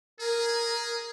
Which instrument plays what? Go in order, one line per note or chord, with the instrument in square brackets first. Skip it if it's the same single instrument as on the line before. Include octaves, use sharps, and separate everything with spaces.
[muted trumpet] G#4 [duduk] A#4